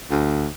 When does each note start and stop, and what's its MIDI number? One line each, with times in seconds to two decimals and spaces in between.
0.11 0.47 38